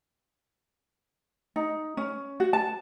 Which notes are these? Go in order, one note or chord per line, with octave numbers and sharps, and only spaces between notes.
D#4
C#4
F#4
A5